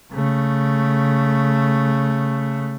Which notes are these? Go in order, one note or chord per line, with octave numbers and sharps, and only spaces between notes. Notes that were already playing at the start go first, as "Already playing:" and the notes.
C#3 A3